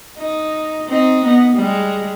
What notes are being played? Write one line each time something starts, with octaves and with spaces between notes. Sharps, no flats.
D#4
C4 D#4
B3 D#4
G3 G#3